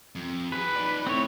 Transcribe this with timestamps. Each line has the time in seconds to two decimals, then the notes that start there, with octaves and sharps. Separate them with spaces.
0.15 F2
0.52 F#4 G#4 B4
0.76 D#4 D5
1.07 A3 C4 E4 C#5